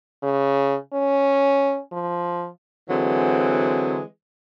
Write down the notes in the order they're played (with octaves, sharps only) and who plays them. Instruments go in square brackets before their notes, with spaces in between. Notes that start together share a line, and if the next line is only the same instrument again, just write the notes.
[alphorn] C#3
C#4
F3
[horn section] D3 E3 F#3 G#3 C4